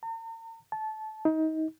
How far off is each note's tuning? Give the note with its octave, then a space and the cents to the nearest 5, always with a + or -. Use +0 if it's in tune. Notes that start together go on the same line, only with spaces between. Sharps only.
A#5 -45
A5 -20
D#4 +25